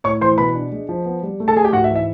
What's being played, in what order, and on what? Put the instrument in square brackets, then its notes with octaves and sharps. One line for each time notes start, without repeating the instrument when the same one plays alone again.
[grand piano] A2 C#5 C#6
E3 C5 C6
B2 B4 B5
D4
G#3
F3
B3
G3
A3
A4 A5
A3 G#4 G#5
G4 G5
G#2 F#4 F#5
E5
E3
E5